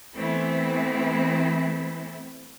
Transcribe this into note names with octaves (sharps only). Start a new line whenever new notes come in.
E3 A3 B3 C4 E4